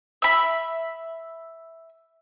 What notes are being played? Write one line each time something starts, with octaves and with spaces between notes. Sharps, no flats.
E5 B5